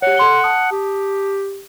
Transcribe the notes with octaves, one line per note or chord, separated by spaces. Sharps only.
G4 C#5 F#5
A4 C6 G7
A5 D#6
G4